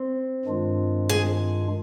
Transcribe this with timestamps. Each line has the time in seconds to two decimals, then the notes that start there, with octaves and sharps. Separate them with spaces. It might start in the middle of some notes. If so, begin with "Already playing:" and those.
Already playing: C4
0.45 G2 D#3 G#3 D4 F4
1.09 G#4